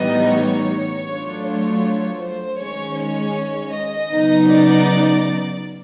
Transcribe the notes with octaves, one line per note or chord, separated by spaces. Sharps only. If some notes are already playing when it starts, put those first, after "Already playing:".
Already playing: A2 E3 G3 B3 D#4 D#5
C#5
F#3 A3 D4 F4
C#5
C5
D#3 G#3 C#4 C#5
C#5
D#5
C#3 F#3 B3 D#4
D5